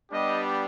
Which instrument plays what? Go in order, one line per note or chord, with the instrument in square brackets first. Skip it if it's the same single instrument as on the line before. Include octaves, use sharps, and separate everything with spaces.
[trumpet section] G3 B3 D4 G4 D#5